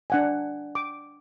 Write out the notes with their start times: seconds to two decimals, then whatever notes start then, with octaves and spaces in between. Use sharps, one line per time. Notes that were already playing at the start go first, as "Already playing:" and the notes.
0.10 D4 F#5 G#5
0.75 D6